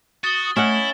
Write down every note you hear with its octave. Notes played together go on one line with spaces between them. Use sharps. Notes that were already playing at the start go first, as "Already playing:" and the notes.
F#4 D#6 A6 G7
A3 C#4 E4 D#5 F#5 E7